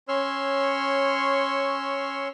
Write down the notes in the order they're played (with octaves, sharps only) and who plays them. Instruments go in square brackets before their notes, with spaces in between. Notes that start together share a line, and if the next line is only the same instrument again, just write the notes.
[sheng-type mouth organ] C#4 C#5 C6 C#6 E6 F6